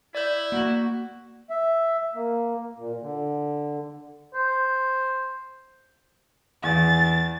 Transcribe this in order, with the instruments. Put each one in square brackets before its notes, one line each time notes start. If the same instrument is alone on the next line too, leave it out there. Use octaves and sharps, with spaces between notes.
[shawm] E4 [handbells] D5 G6
[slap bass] A#3 [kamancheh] F#4
[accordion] E5
A#3
A#2
D3
[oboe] C5
[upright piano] E2 [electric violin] A6